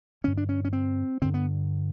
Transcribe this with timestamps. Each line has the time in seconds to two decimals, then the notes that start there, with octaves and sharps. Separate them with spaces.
0.24 G2 D3 C#4
0.37 D4
0.49 C#4
0.65 C#4
0.73 C4
1.22 G2 D3 C4
1.34 B3